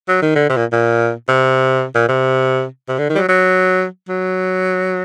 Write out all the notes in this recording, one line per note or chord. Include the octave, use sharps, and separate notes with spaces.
F#3
D#3
D3
C3
A#2
A#2
C3
A#2
C3
C3
D3
D#3
G3
F#3
F#3
F#3